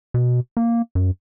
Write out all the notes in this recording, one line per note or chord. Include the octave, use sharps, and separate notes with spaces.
B2
A#3
F#2